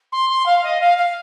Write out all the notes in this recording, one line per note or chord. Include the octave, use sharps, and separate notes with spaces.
C6
C6
F5
D#5
F5
F5